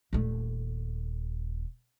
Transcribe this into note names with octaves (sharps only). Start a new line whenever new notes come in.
D#1 A3